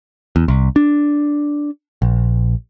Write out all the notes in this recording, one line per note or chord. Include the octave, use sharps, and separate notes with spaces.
E2
C2
D4
A#1